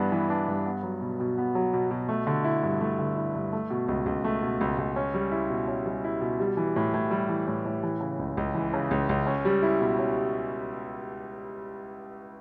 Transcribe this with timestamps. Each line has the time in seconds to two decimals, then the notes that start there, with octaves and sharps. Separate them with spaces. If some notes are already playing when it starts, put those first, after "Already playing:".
Already playing: G2 E3 B3 D4
0.12 E3
0.30 D4
0.48 G2
0.66 B3
0.83 F#3
1.01 B2
1.20 B2
1.38 B3
1.55 F#3
1.73 B2
1.91 B2
2.09 A3
2.27 D3
2.44 E4
2.63 G2
2.81 A3
2.99 D3
3.17 E4
3.35 G2
3.53 A3
3.70 B2
3.88 C#2
4.06 C#2
4.24 A3
4.42 B2
4.61 C#2
4.78 C#2
4.96 C#4
5.14 G3
5.31 E4
5.50 B2
5.68 C#4
5.86 G3
6.04 E4
6.21 B2
6.40 G3
6.57 E3
6.76 A2
6.94 A2
7.11 G3
7.29 E3
7.47 A2
7.65 A2
7.83 E3
8.01 C#3
8.19 C#2
8.37 C#2
8.55 E3
8.74 C#3
8.91 C#2
9.09 C#2
9.27 C#4
9.45 G3
9.63 E4
9.80 B2
9.99 C#4